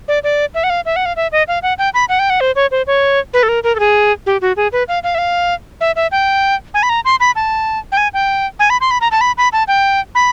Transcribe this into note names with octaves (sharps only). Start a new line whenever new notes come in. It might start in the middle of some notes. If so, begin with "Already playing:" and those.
D5
D5
E5
F#5
F5
E5
F#5
F5
E5
D#5
F5
F#5
G5
B5
F#5
G5
F#5
C5
C#5
C5
C#5
B4
A4
A#4
A#4
A4
G#4
G4
F#4
G#4
B4
F5
F5
E5
F5
E5
E5
G5
G#5
B5
A#5
C6
B5
A5
G5
G#5
G5
G#5
B5
C6
B5
A#5
A5
B5
B5
A5
G5
B5